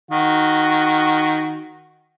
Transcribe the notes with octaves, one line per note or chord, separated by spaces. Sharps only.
D#3 F#4